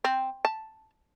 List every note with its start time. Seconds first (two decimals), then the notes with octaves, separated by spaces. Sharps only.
0.04 C4
0.45 A5